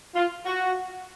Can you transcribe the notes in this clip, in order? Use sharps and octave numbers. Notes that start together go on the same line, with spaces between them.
F4
F#4